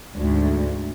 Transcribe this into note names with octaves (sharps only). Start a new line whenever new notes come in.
D2 G#2